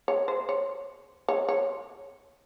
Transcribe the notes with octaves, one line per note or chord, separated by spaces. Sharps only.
C#5
C5
C#5
C#5
C#5